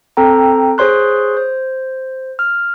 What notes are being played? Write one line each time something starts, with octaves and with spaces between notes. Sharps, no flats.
C4 A4 G5 A#5
G#4 C5 C#5 C6 F#6
C5
F6